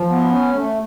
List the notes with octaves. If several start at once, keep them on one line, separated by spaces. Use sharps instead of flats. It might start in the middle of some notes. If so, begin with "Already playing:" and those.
Already playing: F3
B3
C#4
A3